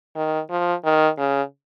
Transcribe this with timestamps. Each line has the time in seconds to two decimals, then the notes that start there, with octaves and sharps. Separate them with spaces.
0.16 D#3
0.50 F3
0.85 D#3
1.18 C#3